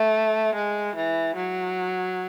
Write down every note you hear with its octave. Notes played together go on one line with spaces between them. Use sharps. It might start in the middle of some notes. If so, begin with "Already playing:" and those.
Already playing: A3
G#3
E3
F#3